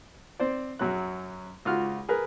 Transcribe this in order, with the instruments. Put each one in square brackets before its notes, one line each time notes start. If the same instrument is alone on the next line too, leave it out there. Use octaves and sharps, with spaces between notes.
[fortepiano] C4 C5 D5
F#2 F#3 F#6
C#2 F4 F#4 F6
G#4 A#4 B4